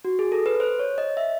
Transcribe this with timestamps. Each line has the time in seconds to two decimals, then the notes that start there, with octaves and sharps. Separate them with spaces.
0.05 F#4
0.19 G#4
0.32 A4
0.46 B4
0.60 C5
0.79 C#5
0.98 D#5
1.17 E5